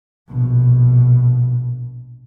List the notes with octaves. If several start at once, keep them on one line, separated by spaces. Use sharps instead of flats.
A#1 B2